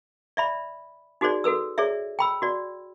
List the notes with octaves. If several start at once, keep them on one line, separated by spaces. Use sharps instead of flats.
D5 E5 B5
D#4 F#4 G#4 C5 D5
F#4 A4 B4 E6
G#4 C#5 D5 E5
G5 B5 E6
F#4 D5